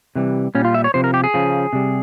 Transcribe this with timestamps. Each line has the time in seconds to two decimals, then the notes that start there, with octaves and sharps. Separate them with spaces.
0.15 C3 E3 G3
0.55 A#2 G3 C#4
0.65 F4
0.74 E5
0.84 C#5
0.94 C3 F3 C5
1.04 A#4
1.14 G4
1.24 G#4
1.34 C#3 F3
1.73 C3 G3